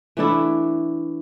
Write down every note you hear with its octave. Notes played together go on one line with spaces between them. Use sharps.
E3 A3 D4 E4